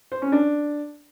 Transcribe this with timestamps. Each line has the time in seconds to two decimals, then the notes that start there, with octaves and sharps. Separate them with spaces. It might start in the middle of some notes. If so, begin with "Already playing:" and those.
0.12 C5
0.22 C#4
0.32 D4